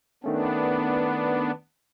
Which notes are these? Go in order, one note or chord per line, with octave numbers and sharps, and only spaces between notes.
D#3 A3 B3 C#4 D4